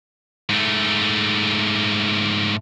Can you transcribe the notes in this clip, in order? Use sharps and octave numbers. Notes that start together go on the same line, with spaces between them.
G#2 A3